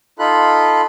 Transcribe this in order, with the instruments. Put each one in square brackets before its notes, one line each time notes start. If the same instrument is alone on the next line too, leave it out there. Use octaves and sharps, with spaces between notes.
[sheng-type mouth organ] D#4 F4 A4 B5 F#6